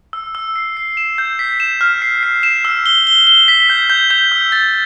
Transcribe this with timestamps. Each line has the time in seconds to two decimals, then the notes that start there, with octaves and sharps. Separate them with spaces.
0.13 E6
0.35 E6
0.56 C7
0.77 C7
0.97 E7
1.18 G6
1.39 B6
1.60 E7
1.81 F6
2.02 C7
2.23 C7
2.43 E7
2.65 E6
2.86 G7
3.07 G7
3.27 G7
3.48 B6
3.70 G6
3.90 G6
4.10 G6
4.32 E6
4.52 A6